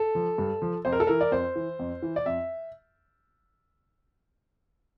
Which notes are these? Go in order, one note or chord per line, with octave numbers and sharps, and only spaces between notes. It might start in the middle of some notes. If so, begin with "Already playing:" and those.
Already playing: A4
F3
G2
F3
F2 C5
A#4
A4
E3 A#4
D5
F2 C5
E3
F2
E3
D5
F2 E5